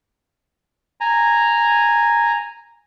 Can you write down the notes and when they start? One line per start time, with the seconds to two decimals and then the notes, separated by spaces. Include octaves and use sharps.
1.01 G#5 A#5